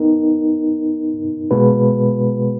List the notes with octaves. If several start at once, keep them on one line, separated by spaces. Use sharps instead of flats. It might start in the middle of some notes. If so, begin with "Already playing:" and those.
Already playing: B3 D#4 A#4
B2 G#3 B3 F#4 B4